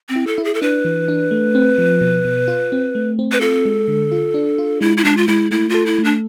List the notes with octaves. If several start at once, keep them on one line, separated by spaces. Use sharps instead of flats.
C4
E4
A4
E4
G#4
A4
D4 B4
E3
D4
A3
C4
F3
B2
B2
F4
C4
A3
C4
B4
F4 A4
G#3
D3
F4
D4
F4
G#3 E4
E4
G#3 D4
F4
G#3 E4
A3 E4
F4 A4
E4
A3
D4